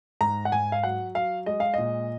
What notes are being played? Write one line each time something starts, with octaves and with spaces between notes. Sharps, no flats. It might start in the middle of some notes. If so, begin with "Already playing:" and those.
G#2 A#5
F#5
G#2 G#5
F5
F#3 F#5
F#3 F5
G#3 D#5
F5
A#2 D#5